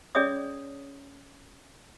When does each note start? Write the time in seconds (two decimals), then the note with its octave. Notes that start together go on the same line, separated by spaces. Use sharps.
0.15 C#4 G#4 C#5 D5 E5 D#6